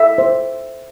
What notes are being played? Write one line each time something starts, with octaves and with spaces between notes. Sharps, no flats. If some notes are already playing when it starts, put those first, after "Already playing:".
Already playing: A4 E5
C5